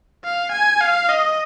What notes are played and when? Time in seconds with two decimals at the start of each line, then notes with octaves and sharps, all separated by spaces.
0.24 F5
0.52 G#5
0.81 F5
1.09 D#5